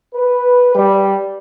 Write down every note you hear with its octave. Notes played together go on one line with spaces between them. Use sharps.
B4
G3